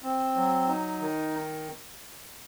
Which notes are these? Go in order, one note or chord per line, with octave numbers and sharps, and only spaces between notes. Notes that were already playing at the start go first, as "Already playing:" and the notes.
C4
F#3
D#4
D#3